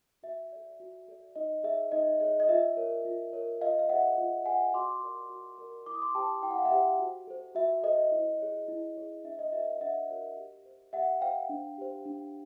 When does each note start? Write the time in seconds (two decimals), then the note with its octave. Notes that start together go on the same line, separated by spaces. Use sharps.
0.23 F#4 E5
0.52 A4 D5
0.80 F#4
1.08 A4 D5
1.36 D#4 D#5
1.64 G#4 C#5 E5
1.92 D#4 D#5
2.20 G#4 C#5 D#5
2.40 D#5
2.49 F4 E5
2.77 A#4 C#5
3.05 F4
3.33 A#4 C#5
3.61 F4 D#5 F5
3.79 F5
3.89 G#4 C5 E5 F#5
4.18 F4
4.46 G#4 C5 F#5 G#5
4.74 F#4 C6 D6
5.03 A#4 D5
5.30 F#4
5.58 A#4 D5
5.86 E4 D6
5.94 D#6
6.02 C6 D6
6.15 G4 C5 G5 A5
6.43 E4 G5
6.50 F#5
6.58 F5
6.65 E5 F#5
6.71 G4 C5
6.99 F#4
7.27 A4 C5
7.55 F#4 E5
7.84 A4 C5 D#5
8.12 E4
8.40 G#4 C#5
8.68 E4
8.96 G#4 C#5
9.24 D4 E5
9.39 D#5
9.52 F#4 A#4 C#5 E5
9.70 F5
9.81 D4 E5 F#5
10.08 F#4 A#4 C#5
10.37 G4
10.65 C5
10.93 G4 E5 F#5
11.21 C5 F5 G5
11.49 D4
11.78 G4 C5
12.05 D4